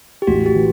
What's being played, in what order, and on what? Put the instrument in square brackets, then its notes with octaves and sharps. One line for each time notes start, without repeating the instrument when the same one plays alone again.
[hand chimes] G4
[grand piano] A1 [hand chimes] F#4
[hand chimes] G4
[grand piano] E3